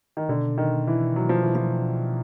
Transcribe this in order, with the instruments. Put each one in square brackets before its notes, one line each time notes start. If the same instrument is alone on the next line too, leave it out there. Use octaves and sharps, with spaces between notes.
[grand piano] D#3
[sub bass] B2 [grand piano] D3
[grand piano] D#3
E3
F#3
F3
E3
F3